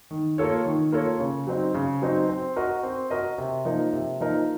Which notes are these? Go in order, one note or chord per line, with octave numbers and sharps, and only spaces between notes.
D#3
A#3 F4 A4 C#5
D#3
A#3 F4 A4 C#5
C#3
F#3 C4 D#4
C#3
F#3 C4 D#4
C4
F#4 A#4 D#5
C4
F#4 A#4 D#5
C3
F3 A#3 D#4 A#4
C3
F3 A#3 D#4 A#4